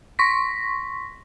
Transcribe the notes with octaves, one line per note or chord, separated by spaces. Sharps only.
C6 C#6 A#6 B6